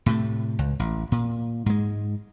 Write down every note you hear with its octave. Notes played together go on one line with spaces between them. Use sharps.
A2 C3 A3
C#2
A1
A#2
G#2 G#3